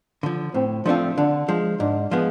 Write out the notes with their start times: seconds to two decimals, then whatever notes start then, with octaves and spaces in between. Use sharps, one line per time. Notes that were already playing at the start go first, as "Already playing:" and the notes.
0.23 D3 F3
0.54 A2 C4
0.86 F3 A3 C4 D4 F4
1.18 D3 D4
1.48 F3 G#3
1.80 G#2 D4
2.11 F3 G#3 B3